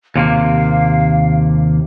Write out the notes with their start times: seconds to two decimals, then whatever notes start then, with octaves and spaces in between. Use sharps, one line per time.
0.16 D#2 C3 A#3 F5